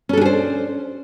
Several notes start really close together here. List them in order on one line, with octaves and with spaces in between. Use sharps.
C#4 A4 D4 G#4 C5